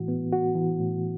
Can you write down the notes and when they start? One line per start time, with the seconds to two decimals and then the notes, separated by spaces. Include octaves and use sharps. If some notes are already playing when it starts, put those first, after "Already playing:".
Already playing: A2 E3 F#4
0.08 B3
0.32 F#4
0.55 E3
0.79 A2